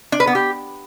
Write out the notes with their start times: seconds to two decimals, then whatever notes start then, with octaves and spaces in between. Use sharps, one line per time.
0.12 D4
0.20 B4
0.27 B3
0.35 G4